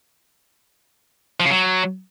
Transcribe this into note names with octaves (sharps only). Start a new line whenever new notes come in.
F3
C#3
F#3